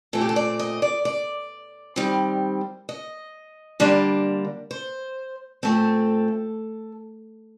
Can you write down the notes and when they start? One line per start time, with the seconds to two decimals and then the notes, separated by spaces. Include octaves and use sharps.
0.13 A#2 A3 C4 A4
0.21 G4
0.29 A4
0.36 D5
0.59 D#5
0.82 D5
1.05 D5
1.96 D#3 G3 C4
2.89 D#5
3.80 D3 G3 A#3 D4
4.71 C5
5.63 A#2 A3 C4 A4